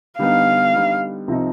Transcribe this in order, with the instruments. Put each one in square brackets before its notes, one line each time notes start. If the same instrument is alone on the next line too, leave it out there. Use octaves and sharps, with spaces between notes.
[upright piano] D3 G3 B3 D#4 [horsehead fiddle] F5
[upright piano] D3 G3 B3 D#4
C2 C3 F3 C4 D#4